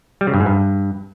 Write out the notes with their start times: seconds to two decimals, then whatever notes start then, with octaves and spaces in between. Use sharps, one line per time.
0.21 G3
0.27 C#3
0.34 G2
0.40 G#2
0.46 G2